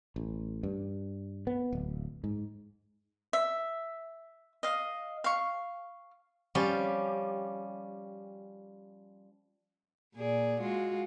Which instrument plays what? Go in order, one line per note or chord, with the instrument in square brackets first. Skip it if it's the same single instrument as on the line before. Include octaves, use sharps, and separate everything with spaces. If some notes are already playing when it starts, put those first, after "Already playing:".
[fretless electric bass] A1
G2
B3
D1
G#2
[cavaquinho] E5
D#5 F5
F5 C#6
[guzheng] F3 G3 C#4 G4
[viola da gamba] A#2 G#4 D5
G#3 F4 F#4